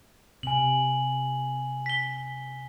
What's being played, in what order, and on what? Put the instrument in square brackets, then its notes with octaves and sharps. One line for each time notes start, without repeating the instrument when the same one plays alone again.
[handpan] C3 [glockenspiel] G#5 F#7
[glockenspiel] B6 G7